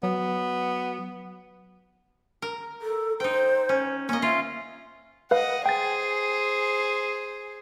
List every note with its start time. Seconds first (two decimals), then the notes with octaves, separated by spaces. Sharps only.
0.03 F#3 B3
2.42 A#4
2.82 A4
3.20 D#4 C5 G5
3.69 C#4
4.09 A#3 C#4 D#5
4.22 F4 E5
5.31 B4 D#5 F5 F#5
5.66 G#4 C5 G5 A6